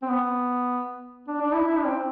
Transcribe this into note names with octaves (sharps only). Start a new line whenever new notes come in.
C4
B3
D4
D4
E4
E4
D4
C4